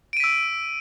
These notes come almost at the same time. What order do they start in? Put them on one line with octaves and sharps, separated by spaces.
D7 D#7 B6 E6